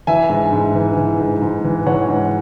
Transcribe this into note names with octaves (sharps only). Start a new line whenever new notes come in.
E3 E5 G#5
G#2
G#2
E3
E3
G#2
G#2
E3
E3 C#5 F#5
G#2